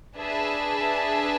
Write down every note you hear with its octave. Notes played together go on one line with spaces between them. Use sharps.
D4 G#4 B4 E5 A5